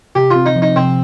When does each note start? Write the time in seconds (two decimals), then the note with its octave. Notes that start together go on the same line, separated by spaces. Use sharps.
0.15 C3 G4
0.31 F4
0.36 C4
0.46 D#4
0.56 F3
0.62 D#4
0.76 C3 C4